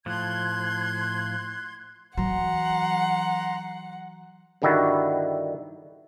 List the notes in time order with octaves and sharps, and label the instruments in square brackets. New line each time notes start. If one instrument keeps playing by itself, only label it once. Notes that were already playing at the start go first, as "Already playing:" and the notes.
[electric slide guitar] A2 F3 [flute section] C6 G#6 [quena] F#6
[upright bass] E3 F#3 [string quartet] F#5 [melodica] A#5 C6
[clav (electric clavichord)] G2 D3 D#3 G3 E4 F#4